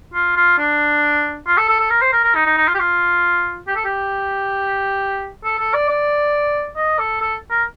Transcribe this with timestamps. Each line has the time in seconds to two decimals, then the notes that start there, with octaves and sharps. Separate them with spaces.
0.14 F4
0.36 F4
0.58 D4
1.47 F4
1.57 A4
1.69 A4
1.79 A4
1.90 A#4
2.02 C5
2.12 A#4
2.24 A#4
2.35 D#4
2.46 D#4
2.57 D#4
2.68 F4
2.75 G4
2.79 F4
3.67 G4
3.76 A4
3.85 G4
5.44 A4
5.59 A4
5.74 D5
5.89 D5
6.77 D#5
6.99 A4
7.21 A4
7.50 A#4